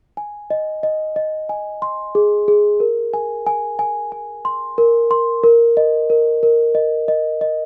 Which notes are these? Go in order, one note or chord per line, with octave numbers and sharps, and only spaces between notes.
G#5
D#5
D#5
D#5
G#5
C6
G#4
G#4
A#4
G#5
G#5
G#5
G#5
C6
A#4
C6
A#4
D#5
A#4
A#4
D#5
D#5
D#5